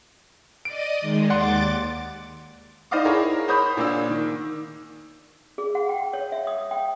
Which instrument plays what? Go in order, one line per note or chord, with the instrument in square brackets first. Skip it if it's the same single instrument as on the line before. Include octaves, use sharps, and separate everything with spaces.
[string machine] D5 D#5 D#6 [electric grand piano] D7
[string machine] D#3 G#3
[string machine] D#2 D6 A6 [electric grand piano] D5 F#5 C6
[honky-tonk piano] D#4 C5 D5 D#5 F5 D6
E4 G#4 A#4 C#5
C5 C#5 B5 D#6 G6
A#2 A#3 D4 E6
D#3
[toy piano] G#4
F#5
G5
C#5
E5
D#6
G5